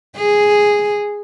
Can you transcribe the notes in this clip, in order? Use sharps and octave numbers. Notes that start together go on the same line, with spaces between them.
G#4